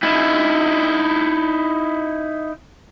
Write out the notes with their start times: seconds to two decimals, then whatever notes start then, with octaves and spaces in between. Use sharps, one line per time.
0.03 D#4 E4